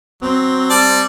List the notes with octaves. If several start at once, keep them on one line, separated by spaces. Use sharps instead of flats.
F#3 C4
G3 D5 A5